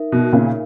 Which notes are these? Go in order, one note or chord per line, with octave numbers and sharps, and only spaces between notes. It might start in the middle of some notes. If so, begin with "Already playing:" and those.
Already playing: D#4 A#4 E5
B2
A#2 C#3